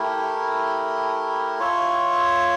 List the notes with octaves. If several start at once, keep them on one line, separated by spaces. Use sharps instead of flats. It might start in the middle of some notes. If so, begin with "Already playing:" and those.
Already playing: A3 E4 G4 A#4
F4 C#5 E5